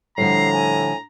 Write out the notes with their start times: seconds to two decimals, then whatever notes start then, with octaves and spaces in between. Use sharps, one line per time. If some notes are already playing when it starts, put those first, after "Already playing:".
0.18 A2 D3 F3 G3 A#5 C7
0.53 G#5